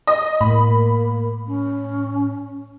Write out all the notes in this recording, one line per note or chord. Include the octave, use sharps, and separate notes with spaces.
D#5 D#6
A2 A#3 B5
C#4